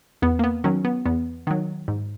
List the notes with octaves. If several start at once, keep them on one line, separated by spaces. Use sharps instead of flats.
E2 B3
A#3
B3
D#3 F#3 C#4
B3
E2 B3
D#3 F#3
G#2